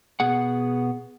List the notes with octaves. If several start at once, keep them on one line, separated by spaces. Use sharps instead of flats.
B2 B3 G#4 F#5